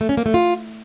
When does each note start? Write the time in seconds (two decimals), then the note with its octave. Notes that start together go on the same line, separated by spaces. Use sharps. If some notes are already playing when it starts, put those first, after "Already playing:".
0.01 A3
0.09 C#4
0.17 A#3
0.26 A3
0.34 F4